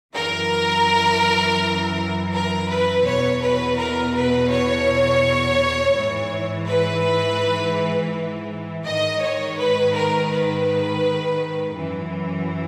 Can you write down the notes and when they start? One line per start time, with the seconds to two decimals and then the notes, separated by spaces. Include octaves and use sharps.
0.15 F#2 E3 A#4
2.33 A#4
2.69 B4
3.05 E2 B2 C#5
3.41 B4
3.77 A#4
4.15 B4
4.50 C#5
5.96 G#2 E3
6.67 B4
8.85 G#2 D#3 D#5
9.21 C#5
9.57 B4
9.94 A#4
10.31 B4
11.75 F#2 E3